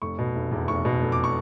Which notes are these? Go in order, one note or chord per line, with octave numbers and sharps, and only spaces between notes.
F1 C#6
B2
F1
E2
F1 C#6
B2
F1
D6
C#6